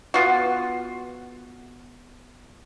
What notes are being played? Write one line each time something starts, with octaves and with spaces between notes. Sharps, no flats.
B3 F4 F#4